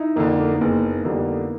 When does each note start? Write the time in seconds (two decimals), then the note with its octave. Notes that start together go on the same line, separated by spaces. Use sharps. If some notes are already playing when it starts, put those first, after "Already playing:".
Already playing: D#4 E4
0.16 F2 D3 A#3
0.39 A#3
0.54 A#3
0.60 F#1 B3
1.05 F2 D3 G3 A#3